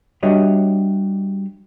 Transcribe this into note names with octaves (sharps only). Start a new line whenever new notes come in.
G3 D4 F#4 C#5 D#5 E5